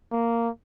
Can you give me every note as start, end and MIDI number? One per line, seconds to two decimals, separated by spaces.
0.12 0.49 58